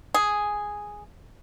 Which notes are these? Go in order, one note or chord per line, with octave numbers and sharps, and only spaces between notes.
G#4